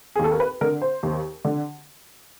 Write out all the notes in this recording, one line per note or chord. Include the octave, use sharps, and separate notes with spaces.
G#4
D#2
A4
A#4
B4
D3 A#4
C5
D#2
D3